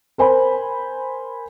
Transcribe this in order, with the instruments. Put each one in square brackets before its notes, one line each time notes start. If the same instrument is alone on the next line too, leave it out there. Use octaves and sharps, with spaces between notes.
[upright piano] A#4 C5 G#5 B5